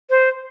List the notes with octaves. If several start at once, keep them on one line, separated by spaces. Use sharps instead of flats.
C5